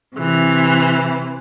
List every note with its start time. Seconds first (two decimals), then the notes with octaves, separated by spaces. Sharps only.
0.15 C3 E3